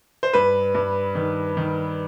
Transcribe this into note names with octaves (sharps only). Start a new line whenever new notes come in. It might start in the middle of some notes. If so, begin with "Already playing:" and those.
C5
G2 B4
G2
D#3
D#3